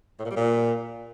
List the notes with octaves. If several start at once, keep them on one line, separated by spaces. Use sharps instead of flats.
A2
A#2
G3
A#2